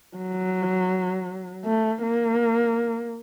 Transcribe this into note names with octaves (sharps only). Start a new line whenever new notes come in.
F#3
A3
A#3